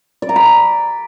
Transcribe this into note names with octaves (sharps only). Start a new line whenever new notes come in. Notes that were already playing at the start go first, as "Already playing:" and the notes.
D5
A#5
B5